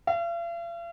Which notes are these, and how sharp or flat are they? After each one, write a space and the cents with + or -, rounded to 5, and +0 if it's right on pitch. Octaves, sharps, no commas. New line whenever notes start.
F5 -45